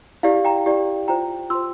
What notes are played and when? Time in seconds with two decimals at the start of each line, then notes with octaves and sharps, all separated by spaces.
0.23 E4 G4 D5 F5
0.45 G5 A#5
0.66 E4 G4 D5
1.08 F4 C5 G5 A#5
1.50 F4 C5 C6 E6